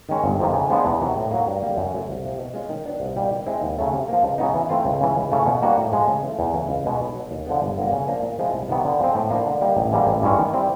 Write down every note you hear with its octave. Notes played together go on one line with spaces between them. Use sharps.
D#3 G#3 C#4
G1
F2 C3 D#3
C#3
F3 G#3 B3 D4
E2
C3 D#3 F#3 B3
A2
F#3 A#3
G2
D3 G3 A#3
F#2
C#3 F#3 A3 C#4
C2
C3 F3
B2
G#3 C#4 F4
D#3
F#3 B3 D4
C2
B2 G3 A#3
D#3
G#3 C4 E4
D#2
C#3 F#3 A3 C#4
C3
F3 A#3
C#2
C#3 F#3 B3 D#4
E3
A3 C4 F4
C#2
C#3 E3
C#2
C#3 E3 A3 C#4
B2
G3 A#3 D4 F#4
A2
F3 G#3
C#3
E3
A3
E2
C#3 E3 A3
C#2
B2 G#3 B3 D#4
B1
B2 F#3
D#2
D3 F3 G#3 B3
G1
G2 D3 F#3 A#3
C#3
F3 A#3 D4
A#2
F3 G#3 C4 E4
C2
C3 D#3 F#3 B3
D3
F3 G#3 C4
A2
F3 A#3 D4
D3
G3 A#3 D#4
A1
G#2 E3 G3 A#3
A1
G2 E3 G#3 C#4
D#3
G3 C4 E4